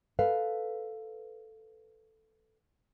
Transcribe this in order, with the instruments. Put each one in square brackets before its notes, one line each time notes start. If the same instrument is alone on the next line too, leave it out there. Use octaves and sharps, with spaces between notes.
[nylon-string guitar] A4 B4 F5